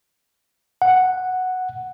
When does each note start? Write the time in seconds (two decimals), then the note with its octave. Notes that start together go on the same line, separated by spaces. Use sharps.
0.82 F#5